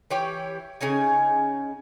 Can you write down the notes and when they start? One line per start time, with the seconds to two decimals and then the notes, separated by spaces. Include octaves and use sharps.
0.11 E3 G4 C#5 G5
0.81 C#3 C#4 D#4 G#5